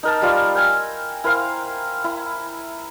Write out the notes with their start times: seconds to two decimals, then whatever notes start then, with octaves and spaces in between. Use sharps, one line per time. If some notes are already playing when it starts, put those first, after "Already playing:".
0.03 D#4 A#4 A5
0.22 G3 F4 F5
0.55 G5 G#5 E6
1.24 E4 A#4 C5 F5
2.04 E4